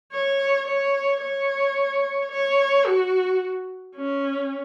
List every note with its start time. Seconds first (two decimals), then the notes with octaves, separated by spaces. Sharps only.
0.13 C#5
0.68 C#5
1.22 C#5
2.32 C#5
2.86 F#4
3.96 C#4